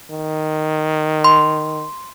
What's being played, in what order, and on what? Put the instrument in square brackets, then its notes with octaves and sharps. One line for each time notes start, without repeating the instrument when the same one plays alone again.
[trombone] D#3
[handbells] C6